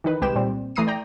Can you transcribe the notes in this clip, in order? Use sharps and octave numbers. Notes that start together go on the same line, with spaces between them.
D#3 E3 D#4 B4
C2 G#3 G4 B4 G5 E7
A#2 G3 C4
E3 A3 A#5 D#6 C7 D#7
D5 G5 A#5